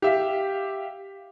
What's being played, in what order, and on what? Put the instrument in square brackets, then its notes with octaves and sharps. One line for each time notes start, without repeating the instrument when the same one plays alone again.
[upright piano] G4 E5 F5